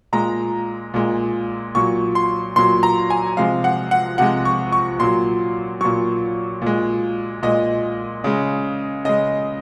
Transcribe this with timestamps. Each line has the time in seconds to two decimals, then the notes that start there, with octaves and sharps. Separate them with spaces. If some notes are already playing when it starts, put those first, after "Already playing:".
0.13 A#2 G#3 A#5
0.94 A#2 G#3
1.75 A#2 F#3 C#6
2.15 C6
2.56 A#2 F#3 C6
2.83 A#5
3.10 G#5
3.37 C3 F3 G#3 F5
3.64 F#5
3.91 F#5
4.18 C3 F3 G#3 F#5
4.45 C#6
4.72 C#6
4.99 A#2 F#3 C6
5.81 A#2 F#3 C#6
6.62 A#2 G#3
7.43 A#2 G#3 D#5
8.24 C#3 G#3
9.05 C#3 G#3 D#5